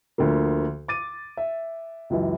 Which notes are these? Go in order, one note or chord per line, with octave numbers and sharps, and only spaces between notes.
D2 D3 F3 A#3
D6 A6 D#7
E5
C#2 F#2 E3